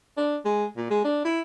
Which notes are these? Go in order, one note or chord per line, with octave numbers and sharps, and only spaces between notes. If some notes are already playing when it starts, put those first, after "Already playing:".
D4
G#3
A#2
G#3
D4
E4